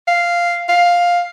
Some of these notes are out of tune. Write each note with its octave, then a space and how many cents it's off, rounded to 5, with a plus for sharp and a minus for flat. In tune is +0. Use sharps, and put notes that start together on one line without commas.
F5 -5
F5 +5